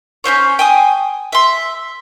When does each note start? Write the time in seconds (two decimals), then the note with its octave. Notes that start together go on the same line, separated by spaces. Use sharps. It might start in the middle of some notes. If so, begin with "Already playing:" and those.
0.24 C#4 E4 C5 C#5
0.59 G5 G#5 D#6
1.32 E5 C6